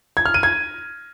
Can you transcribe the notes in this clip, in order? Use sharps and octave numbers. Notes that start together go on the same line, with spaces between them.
G#6
F6
D#7
G#6